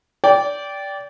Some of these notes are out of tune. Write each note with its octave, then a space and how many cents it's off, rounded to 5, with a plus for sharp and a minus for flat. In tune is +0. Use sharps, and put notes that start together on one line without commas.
D5 -20 G5 +0